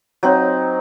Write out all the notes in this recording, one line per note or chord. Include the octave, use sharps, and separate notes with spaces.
F#3 C4 D#4